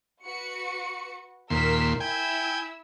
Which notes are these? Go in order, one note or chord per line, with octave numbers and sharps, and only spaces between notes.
F#4 B4 C#7
D#2 A#2 A#4 C6 E6 B6
E4 G5 G#5 E6